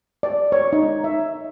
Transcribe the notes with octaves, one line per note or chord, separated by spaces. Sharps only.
D5
C#5
D#4
E5